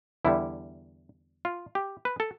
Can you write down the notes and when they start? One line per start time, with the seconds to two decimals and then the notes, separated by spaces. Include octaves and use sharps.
0.25 E2 D3 G3 E4
1.45 F4
1.75 G4
2.05 B4
2.20 A4